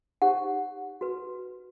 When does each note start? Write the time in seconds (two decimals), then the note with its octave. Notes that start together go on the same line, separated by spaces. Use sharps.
0.22 D#4 G4 C5 F#5
1.01 F#4 B4